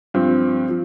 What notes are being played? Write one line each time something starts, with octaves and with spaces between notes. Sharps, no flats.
G2 F3 C4
F3